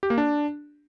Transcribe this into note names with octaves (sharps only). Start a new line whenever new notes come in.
G4
A#3
D4